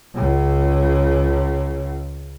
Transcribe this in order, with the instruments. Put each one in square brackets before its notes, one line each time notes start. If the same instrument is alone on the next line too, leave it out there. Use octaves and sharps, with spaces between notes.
[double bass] C#2 C#3